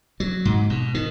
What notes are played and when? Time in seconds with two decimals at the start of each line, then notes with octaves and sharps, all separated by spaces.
0.20 F#3
0.45 G#2
0.70 B2
0.94 D#3